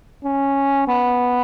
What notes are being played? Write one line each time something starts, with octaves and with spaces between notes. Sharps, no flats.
C#4
B3